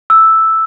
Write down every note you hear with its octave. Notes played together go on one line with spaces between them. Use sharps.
E6